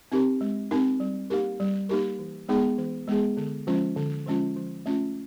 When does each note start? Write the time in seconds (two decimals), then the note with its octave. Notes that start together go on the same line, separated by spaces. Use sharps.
0.12 C4 D#4 G4 A#4
0.41 G#3
0.71 C4 D#4 G4 A#4
1.00 G3
1.30 A#3 D#4 G4 A#4
1.60 G3
1.89 A#3 D#4 G4 A#4
2.19 E3
2.48 G#3 B3 D#4 G#4
2.78 E3
3.07 G#3 B3 D#4 G#4
3.37 D3
3.67 F3 G#3 C#4 F4
3.96 D3
4.26 F3 G#3 C#4 F4
4.56 F3
4.86 A3 C#4 F4